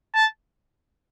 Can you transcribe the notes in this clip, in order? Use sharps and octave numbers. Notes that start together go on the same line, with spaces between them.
A5